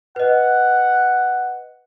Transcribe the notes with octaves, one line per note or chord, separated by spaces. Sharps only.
B4 D#5 F#5